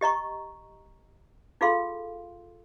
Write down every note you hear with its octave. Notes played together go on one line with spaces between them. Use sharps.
G4 D#5 A#5 C#6
D#4 F4 G#4 A4 F5 C6